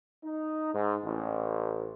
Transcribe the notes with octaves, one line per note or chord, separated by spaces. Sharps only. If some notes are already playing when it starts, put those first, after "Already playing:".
D#4
G#2
A1